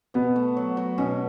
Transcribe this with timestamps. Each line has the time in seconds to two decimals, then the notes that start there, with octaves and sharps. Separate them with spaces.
0.14 B2 B3
0.36 A3
0.57 F#3
0.77 F#3
0.98 B2 C#4